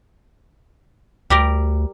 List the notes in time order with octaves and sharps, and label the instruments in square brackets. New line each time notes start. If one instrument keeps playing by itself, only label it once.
[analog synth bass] D2 [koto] G3 G4 A#4